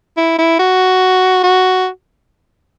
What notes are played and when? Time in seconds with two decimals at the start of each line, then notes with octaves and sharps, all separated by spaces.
0.17 E4
0.39 E4
0.59 F#4
1.43 F#4